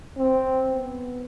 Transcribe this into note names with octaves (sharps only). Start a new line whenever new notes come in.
C4
B3